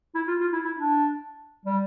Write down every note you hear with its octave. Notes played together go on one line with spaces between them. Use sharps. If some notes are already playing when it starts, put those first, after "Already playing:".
E4
F4
F4
E4
E4
D4
G3